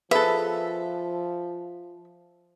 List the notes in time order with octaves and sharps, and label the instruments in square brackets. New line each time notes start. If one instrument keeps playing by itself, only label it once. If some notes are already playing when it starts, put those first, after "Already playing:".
[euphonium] F3 [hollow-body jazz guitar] G#4 A4 [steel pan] B4 [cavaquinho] E5